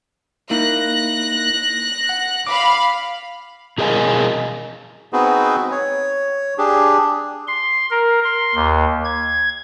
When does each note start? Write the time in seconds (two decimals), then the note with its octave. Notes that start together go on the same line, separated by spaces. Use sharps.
0.50 A#3 D#4 E4 F#6 A#6
2.09 F#5
2.47 F5 B5 D6
3.78 B2 G#4 A#4 D#5 F5 G#5
5.13 B3 C4 D#4 F#4 G#4 B4
5.71 C#5
6.58 D4 G4 G#4
7.48 C6
7.91 A#4
8.24 C6
8.55 D#2
9.05 G#6